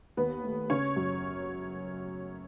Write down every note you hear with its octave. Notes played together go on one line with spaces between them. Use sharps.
D#2 B3 B4
A3
C#3 C#4 C#5
F#2